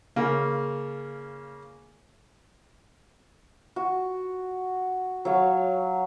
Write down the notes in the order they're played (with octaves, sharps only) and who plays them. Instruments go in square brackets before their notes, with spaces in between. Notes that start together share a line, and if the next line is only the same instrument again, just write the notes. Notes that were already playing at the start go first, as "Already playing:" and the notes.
[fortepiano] C#3 A#3
[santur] F#4
F#3 C#5 F5